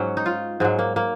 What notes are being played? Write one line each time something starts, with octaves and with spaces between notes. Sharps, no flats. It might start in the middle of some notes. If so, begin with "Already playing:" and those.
Already playing: G#2 F#3 C#4
D#4
F4
G#2 F#3 G#3
A#3
A#3